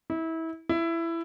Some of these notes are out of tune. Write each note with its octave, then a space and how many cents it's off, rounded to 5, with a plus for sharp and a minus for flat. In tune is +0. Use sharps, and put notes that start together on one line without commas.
E4 -25
E4 +15